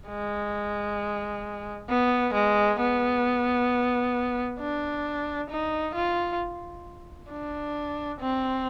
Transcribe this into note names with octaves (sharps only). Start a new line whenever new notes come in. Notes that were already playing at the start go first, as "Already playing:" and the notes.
G#3
B3
G#3
B3
D4
D#4
F4
D4
C4